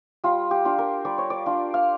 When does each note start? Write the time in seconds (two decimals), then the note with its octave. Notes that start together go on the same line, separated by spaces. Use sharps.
0.24 G3 F4
0.51 G4
0.65 D4 F4
0.78 A#4
1.05 G3 D5
1.18 C#5
1.30 D5
1.46 D4 F4
1.74 F5